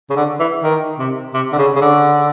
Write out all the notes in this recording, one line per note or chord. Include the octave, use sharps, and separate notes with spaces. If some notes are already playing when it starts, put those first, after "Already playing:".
C#3
D3
E3
D#3
C3
C3
D3
C#3
C#3
D3